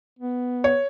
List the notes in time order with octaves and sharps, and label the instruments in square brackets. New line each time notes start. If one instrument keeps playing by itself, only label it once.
[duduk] B3
[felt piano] C#5